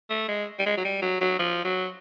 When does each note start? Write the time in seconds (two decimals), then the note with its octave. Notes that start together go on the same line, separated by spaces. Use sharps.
0.10 A3
0.28 G#3
0.59 G3
0.66 G#3
0.77 F#3
0.84 G3
1.02 F#3
1.21 F#3
1.39 F3
1.65 F#3